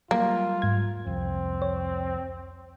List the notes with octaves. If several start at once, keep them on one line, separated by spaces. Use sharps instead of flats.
F#3 G3 A#3 F4
G#2 G#6
C2 F2 C4
C#5